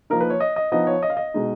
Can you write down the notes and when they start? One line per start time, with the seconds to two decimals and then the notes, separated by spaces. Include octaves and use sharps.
0.10 F3 A#3 D#4 A#4
0.20 B4
0.30 C#5
0.40 D#5
0.56 D#5
0.72 F3 B3 D#4 D#5
0.87 C#5
1.03 D#5
1.10 F5
1.17 D#5
1.34 B2 G#3 D#4